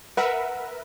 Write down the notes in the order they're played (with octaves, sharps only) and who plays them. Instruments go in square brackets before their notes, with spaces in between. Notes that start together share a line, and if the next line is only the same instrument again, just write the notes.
[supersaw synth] A#4 B4 E5 [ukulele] F#5